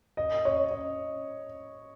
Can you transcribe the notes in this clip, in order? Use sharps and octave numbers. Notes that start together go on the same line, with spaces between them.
D#5
C#5
D#5